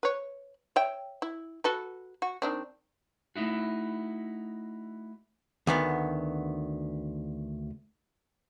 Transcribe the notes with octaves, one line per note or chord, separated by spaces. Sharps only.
B4 C#5
C#5 E5 G5
E4
F#4 A4 B4
F#4
D#3 C4 D4
A3 D#4 E4 F#4
D2 D#3 B3